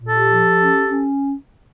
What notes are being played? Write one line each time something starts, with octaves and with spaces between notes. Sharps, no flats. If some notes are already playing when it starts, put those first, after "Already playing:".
Already playing: A#2
G4 A4
F3
C#4
C#4